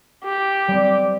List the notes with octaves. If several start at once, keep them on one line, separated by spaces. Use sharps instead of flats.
G4
G3 C4